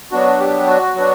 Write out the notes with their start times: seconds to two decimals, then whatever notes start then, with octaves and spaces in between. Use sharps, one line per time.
0.11 F#3 B3 D4 F#4
0.39 G4
0.67 F#4
0.95 F#3 B3 D4